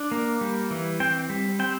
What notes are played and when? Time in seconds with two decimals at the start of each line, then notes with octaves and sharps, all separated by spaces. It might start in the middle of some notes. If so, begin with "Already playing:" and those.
Already playing: D4
0.11 A#3
0.41 G3
0.71 E3
1.00 C4 G5
1.30 G3
1.59 C4 G5